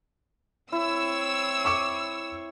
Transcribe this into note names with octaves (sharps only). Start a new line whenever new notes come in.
C4 E4 C#5 E6
C#6 D6 C#7